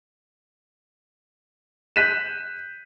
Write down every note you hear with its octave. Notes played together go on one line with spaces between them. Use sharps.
F#6 G6 B6 D#7 E7